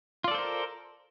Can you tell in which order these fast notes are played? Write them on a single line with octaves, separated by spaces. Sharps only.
F4 D5 A4 C5 A#4